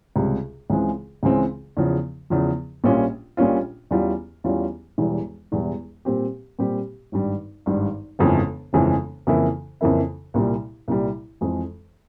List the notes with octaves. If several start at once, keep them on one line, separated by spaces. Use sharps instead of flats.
C#2 C3 G3
C#2 C#3 E3 G#3 C4
C#2 C#3 E3 G#3 C4
E2 C#3 F3
E2 C#3 F3
A#1 A#2 G3 C#4 F4
A#1 A#2 G3 C#4 F4
E2 E3 G3 C#4 F4
E2 E3 G3 C#4 F4
E1 E2 E3 G3
E1 E2 E3 G3
A#2 G3 C4 G4
A#2 G3 C4 G4
G#1 G2 G3
G#1 G2 G3
G1 F2 C#3 E3 G#3
G1 F2 C#3 E3 G#3
F2 C#3 E3 A#3 E4
F2 C#3 E3 A#3 E4
C2 A#2 G3
C2 A#2 G3
F2 E3 G#3